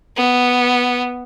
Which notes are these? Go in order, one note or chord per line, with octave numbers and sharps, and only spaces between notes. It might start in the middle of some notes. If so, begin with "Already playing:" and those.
B3